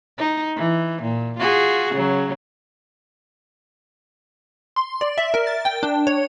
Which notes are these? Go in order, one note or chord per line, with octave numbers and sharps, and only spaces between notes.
D#4
E3
A#2
F4 F#4 G#4
C#3 F#3
C6
D5
E5
A#4
A6
G5
D4
C#5